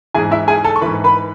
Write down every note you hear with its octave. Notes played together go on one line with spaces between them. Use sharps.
G#2 E3 G#4 G#5
E4 E5
G#4 G#5
A4 A5
C#6
G#2 E3 B4 B5
B4 B5